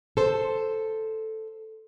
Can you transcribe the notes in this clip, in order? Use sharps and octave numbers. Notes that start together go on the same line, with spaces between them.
A4 C5